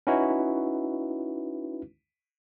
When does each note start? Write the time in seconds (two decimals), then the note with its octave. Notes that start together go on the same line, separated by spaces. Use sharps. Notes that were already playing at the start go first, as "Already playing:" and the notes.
0.07 C#4 D#4 E4 F#4 B4